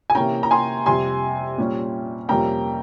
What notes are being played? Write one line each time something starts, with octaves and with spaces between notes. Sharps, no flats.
G#5
C3 E3 A#3 C#4 G5 A#5
A#5
G#5 C6
F2 C3 G3 G#5 C6
A#2 G3 C#4
F2 C3 G3 A#3 C#4 G5 A#5